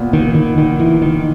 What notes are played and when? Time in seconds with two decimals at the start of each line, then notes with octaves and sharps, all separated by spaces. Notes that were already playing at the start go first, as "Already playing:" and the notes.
Already playing: A#2 B3
0.13 D#3
0.35 D#3
0.58 D#3
0.80 E3
1.02 D#3